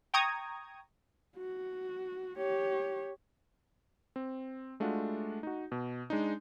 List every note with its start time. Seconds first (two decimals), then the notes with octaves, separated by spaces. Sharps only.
0.14 G5 A#5 C#6 D#6 G#6
1.36 F#4
2.38 G4 C#5
4.16 C4
4.80 G#3 A3 D4 F4 F#4
5.43 D#4 F#4
5.72 B2
6.10 G#3 D4 D#4